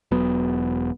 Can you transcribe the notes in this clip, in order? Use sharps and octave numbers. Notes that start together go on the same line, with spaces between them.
E1 F#3 B3